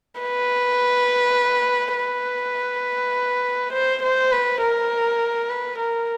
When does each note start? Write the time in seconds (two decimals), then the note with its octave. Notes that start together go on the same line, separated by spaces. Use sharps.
0.20 B4
1.97 B4
3.73 C5
4.03 C5
4.32 B4
4.62 A#4
5.50 B4
5.79 A#4